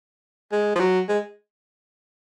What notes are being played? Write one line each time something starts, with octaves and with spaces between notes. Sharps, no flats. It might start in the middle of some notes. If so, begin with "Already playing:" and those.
G#3
F3
F#3
G#3